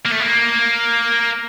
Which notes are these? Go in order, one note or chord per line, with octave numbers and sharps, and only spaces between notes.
A#3
A3
A#3